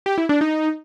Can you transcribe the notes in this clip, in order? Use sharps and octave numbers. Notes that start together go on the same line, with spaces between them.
G4
E4
D4
D#4